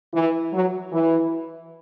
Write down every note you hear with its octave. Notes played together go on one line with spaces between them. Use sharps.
E3
F#3
E3